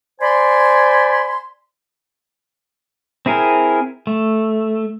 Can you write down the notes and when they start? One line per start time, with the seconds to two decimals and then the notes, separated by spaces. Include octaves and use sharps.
0.21 C5 D5 G#5 B5 C6
3.26 C4 E4 G#4 A#4
4.07 A3